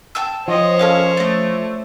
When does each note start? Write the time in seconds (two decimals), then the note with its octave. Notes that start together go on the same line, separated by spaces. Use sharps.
0.15 G5 A5 E6
0.48 F3 C5 C#5 D#5
0.79 C#4 A4 A#4 F5
1.17 A3 D5 D#5